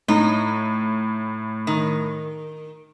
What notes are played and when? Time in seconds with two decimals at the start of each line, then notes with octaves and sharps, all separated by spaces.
0.08 A2 D#4
1.67 D#3